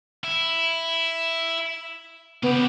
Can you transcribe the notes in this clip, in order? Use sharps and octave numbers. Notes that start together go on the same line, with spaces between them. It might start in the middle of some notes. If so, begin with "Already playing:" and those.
E4
C#3 B3 G4